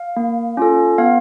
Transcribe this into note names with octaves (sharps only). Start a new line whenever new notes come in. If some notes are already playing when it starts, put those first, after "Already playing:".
Already playing: F5
A#3
C#4 F4 A4
B3 F5